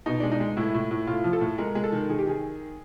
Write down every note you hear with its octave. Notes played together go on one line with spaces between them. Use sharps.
B2 D#4
G#3 D4
D#4
G#3
A2 E4
A2
A2
A2 F4
F3
A4
A2
G#3 A#4
G#3
A4
D#3
D#3 G#4
G4
D#3 G#4